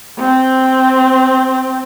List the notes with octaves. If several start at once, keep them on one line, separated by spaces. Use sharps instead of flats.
C4